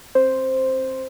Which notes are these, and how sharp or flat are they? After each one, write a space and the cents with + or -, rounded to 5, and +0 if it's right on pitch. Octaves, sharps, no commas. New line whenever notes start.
C4 +30 C5 +0